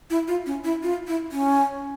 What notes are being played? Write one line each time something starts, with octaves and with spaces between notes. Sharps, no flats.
E4
F4
C#4
E4
F4
E4
C#4